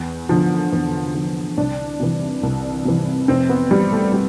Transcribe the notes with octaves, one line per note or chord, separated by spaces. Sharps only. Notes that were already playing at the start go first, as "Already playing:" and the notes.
Already playing: E2
D3 F3
E2
D3 F3
C2 D4
C3 E3
C2
C3 E3
F1 C4
B3
F2 E3 G3
A3
G3